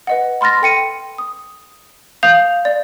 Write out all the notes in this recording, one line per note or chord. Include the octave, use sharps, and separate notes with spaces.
B4 D#5 F#5
B5 C6 F6 A6 A#6
A4 G5 C#7 D#7
D#6
F5 D#6 G6 F7
D5